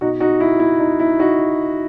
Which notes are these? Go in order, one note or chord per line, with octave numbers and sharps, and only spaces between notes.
B2 D#4 F#4
D#4 F#4
E4
E4
D#4
E4
D#4 F#4